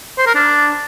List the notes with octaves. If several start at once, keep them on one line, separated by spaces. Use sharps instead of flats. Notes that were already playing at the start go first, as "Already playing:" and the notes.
C5
A#4
D4